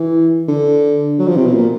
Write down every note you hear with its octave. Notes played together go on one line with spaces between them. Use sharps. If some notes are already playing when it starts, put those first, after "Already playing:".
Already playing: E3
D3
F#3
F3
C3
B2
A#2